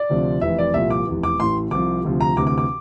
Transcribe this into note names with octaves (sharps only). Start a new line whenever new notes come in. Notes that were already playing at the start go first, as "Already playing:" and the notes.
Already playing: D5
D2 C3 F3
F1 F2 E3 E5
D5
C2 A#2 F3 E5
D6
F1 E2 E3
D6
A1 A2 E3 C6
C2 C3 F3 D6
D2 C3 F3
A#5
D2 C3 E3 D6
D6
D6